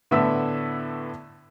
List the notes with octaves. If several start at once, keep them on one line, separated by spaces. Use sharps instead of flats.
A2 D3 A3 B3 E5 E6